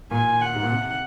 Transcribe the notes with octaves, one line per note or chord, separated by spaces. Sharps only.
A#2 G#5
F#5
G#2
A#2
C3